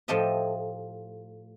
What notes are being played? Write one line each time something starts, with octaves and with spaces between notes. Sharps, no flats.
A2 F3 G4 A4 D#5 E5